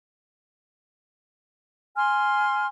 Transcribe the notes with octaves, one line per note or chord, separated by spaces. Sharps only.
G#5 C6 F6